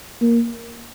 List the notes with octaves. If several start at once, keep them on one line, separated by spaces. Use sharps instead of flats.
A#3